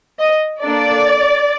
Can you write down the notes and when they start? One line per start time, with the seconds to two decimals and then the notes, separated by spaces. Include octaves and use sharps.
0.20 D#5
0.62 A#3 D4 A4 D5